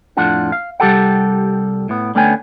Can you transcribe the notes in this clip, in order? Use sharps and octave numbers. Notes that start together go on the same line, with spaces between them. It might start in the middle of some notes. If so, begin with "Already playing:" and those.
F2 A2 D4 F4 F#5
F5
C2 G3 G4 A4 F#5
A2 B3
D3 A3 B3 C#4 G5 G#5